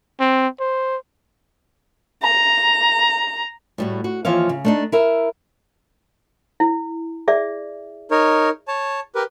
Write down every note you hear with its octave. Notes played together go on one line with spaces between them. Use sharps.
C4
C5
A#5
A2 G3 F#4
F#4
D#2 E3 F3 C#5 F5
C#3
A3 D4 D#4
E4 A#4 E5
E4
G#4 D5 E5
D#4 A#4 C#5
C#5 A5
G4 A#4 B4